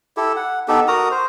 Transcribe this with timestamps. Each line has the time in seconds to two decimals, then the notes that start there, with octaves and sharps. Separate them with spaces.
0.17 E4 G4 A4
0.36 F#5
0.68 B3 D#4 G4 A4
0.88 F#4 A#4 A#5 D#6
1.11 C5